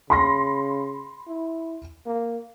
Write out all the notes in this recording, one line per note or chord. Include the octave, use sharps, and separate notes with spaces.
C#3 B5 C6 A#6
E4
A#3